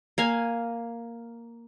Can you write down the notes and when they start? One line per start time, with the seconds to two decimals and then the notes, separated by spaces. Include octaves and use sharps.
0.18 A#3 F5 G#5